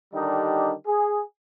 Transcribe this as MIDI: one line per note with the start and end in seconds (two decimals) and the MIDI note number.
0.14 0.73 50
0.14 0.73 51
0.14 0.73 55
0.14 0.73 62
0.14 0.73 63
0.14 0.73 67
0.87 1.23 68